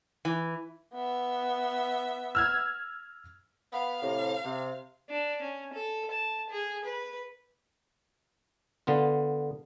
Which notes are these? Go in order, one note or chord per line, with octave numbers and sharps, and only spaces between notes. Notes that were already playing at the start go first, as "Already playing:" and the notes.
E3
B3 E5
E6 F6 G#6
B3 F5 B5
A2 C3
C3
D4
C#4
A4
A5
G#4
B4
D3 B3 F4